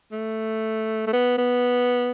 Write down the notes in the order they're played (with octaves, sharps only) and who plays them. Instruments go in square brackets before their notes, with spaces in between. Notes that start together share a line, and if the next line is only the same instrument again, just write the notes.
[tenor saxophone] A3
A3
B3
B3